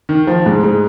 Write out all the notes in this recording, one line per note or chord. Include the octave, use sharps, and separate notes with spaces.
D#3
F3
G#2 G#3
G#2 G#3